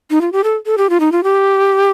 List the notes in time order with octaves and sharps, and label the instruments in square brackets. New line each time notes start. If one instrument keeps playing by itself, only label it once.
[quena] D#4
F4
G4
A4
A4
G4
F4
D#4
F4
G4